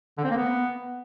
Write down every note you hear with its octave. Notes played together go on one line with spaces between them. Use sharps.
D3
C4
A#3
B3